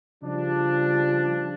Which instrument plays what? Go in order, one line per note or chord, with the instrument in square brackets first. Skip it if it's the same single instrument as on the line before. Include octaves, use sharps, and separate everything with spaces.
[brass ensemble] C#3 F3 G3 D4